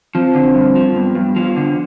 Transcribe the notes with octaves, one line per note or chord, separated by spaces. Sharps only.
F3 C4
D3
G2
F3
G2 B3
G2
F3
D3